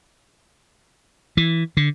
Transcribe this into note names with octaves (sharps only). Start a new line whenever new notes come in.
E3
D3